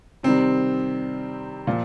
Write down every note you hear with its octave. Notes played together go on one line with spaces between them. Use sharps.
C3 D#3 G3 C4
A#2 F3